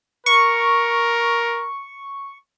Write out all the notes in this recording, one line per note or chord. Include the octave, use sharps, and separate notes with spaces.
A#4 C#6